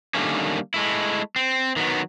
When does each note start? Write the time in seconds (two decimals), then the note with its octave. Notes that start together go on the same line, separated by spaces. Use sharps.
0.14 D3 D#3 G3 A3 A#3 C#4
0.74 G#3 A3 E4
1.36 C4
1.76 D#3 F#3 B3